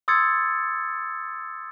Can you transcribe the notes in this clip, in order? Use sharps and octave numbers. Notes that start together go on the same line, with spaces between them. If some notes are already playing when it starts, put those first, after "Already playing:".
C6 D#6 E6 G#6 A6 C#7